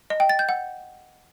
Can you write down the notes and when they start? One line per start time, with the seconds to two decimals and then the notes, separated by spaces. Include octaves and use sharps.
0.10 D#5
0.20 G5
0.29 A6
0.39 G6
0.49 F#5